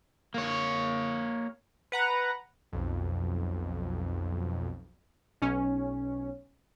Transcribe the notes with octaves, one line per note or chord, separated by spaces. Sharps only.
A#3 C#5
B4 F#5 A#5
B1 F2
B1 C#4